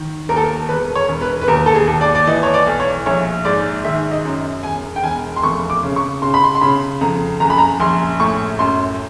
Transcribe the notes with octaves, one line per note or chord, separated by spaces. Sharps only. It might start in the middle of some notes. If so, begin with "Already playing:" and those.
Already playing: D#3
D#2 A#4
A4
A#4
E1 B4
C#5
E1
B4
B4
D#2 A#4
A4
G#4
D#2
D5
D5
E3 D#5
C#5
D5
B1
C#5
A#1 C#5
G#2 D5
D#3 E5
D#5
F#2
E1 G#5
G5
E1 G#5
C6
F1 C#6
D6
C#3
C#6
C#3 C6
B5
C6
C6
C#3 B5
F2 A#5
F#1 A#5
B5
A#5
A#1 C6
A2 C#6
F#2 C6